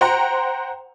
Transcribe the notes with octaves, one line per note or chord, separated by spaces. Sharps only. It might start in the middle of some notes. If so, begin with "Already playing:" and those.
C5 F#5 G5 A#5 C6